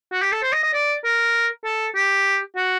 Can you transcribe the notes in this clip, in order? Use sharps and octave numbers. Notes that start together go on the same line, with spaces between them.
F#4
G4
A4
C5
D#5
D#5
D5
A#4
A4
G4
F#4